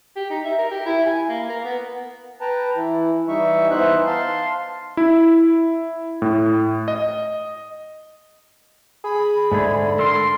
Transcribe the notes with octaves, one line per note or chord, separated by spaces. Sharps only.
G4
D#4
E5
A#4
G4
E4
G#5
A#3
A#4
B3
B4 G5 A5 A#5
E3 E4
E3 G3 D#4 E5 C#6
E3 B3 D#4 C5 E5 F#6
F5 A5 C6
E4
A2
D#5
G#4 B5
G#2 D3 A3 G#4
A4 A#4 C6